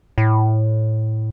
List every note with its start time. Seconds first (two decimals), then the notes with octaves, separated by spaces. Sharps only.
0.18 A2